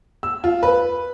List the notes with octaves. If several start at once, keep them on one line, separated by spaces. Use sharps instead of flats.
E6
F4
B4